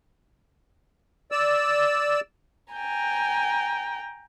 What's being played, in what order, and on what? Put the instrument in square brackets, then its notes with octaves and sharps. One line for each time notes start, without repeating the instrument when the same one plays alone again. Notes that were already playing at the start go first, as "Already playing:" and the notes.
[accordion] D5 E6
[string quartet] G5 G#5 A#5